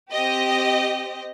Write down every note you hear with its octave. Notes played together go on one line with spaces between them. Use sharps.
C4 G4 D#5